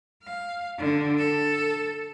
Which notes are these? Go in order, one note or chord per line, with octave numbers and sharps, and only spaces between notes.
F5
D3
A4